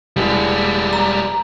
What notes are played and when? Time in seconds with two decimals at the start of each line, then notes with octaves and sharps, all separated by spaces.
0.16 E1 G3 G#3
0.93 A#5